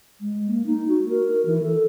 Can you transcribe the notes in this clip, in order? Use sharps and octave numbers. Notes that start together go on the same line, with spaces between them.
G#3
A#3
D#4
F#4
A#4
E3
A4